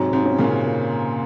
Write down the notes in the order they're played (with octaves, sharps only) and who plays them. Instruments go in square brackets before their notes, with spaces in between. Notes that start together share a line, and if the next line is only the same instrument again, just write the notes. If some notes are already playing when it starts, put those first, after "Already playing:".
Already playing: [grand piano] G#2 C3 [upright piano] F#3
[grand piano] G#2 C3
[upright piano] C#4
[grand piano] A#2 C#3
[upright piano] A#3